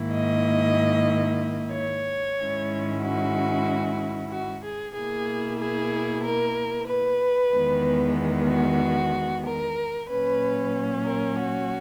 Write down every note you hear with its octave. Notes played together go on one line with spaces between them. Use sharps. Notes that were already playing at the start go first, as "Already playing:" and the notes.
Already playing: G#2 D#3 A#3 E4
D#5
C#5
G#2 D#3 G#3 C#4 E4
F#4
F#4
G#4
B2 A#3 E4 G#4
G#4
A#4
B4
E2 D#3 G#3 B3
F#4
A#4
A#2 F#3 C#4 B4
A#4
F#4